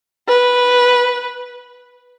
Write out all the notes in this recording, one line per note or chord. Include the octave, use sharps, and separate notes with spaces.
B4